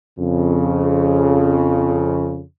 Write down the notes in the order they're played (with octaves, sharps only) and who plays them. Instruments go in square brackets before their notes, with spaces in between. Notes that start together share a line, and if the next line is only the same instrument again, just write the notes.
[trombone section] F2 C#3